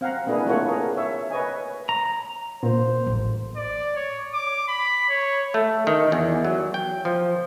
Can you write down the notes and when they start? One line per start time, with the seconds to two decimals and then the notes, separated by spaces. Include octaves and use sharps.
0.01 C4 F5 F#5 A#5
0.27 A#3 D4 E4 G#4 B4
0.46 A3 A#3 F4 A4 C#5 F#5
0.66 G#4 A#4
0.96 C#5 E5
1.30 B4 C#5 D#5 G#5
1.89 A#5
2.63 A#2 C5
3.06 A1
3.56 D5
3.96 C#5
4.33 D6
4.68 B5
5.09 C#5
5.54 A3
5.87 D#3
6.12 E2
6.45 F#3
6.74 G5
7.05 F3